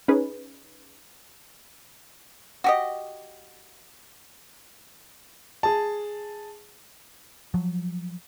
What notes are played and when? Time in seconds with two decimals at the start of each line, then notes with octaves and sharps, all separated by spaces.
0.08 C#4 D#4 G#4 B4
2.64 F#4 G4 D#5
5.63 G#4 A5
7.54 F3 F#3